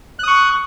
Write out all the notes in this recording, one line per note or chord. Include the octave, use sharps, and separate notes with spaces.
C#6 D#6 F#6